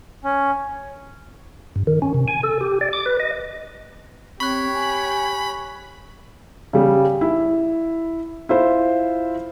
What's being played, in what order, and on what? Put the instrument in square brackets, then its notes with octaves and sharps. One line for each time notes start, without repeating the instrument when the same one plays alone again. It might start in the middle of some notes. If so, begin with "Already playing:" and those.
[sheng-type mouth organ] C#4
[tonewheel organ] G2
D#3
C#4
C3
G#5
A4
G4
D5
D6
B4
D#5
[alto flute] C4 [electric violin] G4 C#5 [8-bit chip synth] B5 [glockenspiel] C#6 F#6
[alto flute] G#5
[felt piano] C#3 G3
E4
E4 F4 C5